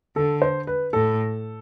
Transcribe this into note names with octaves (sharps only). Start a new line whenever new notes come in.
D3 A4
C5
B4
A2 A4